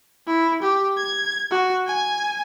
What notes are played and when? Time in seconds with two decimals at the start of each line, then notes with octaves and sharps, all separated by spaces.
0.27 E4
0.62 G4
0.98 G#6
1.51 F#4
1.87 G#5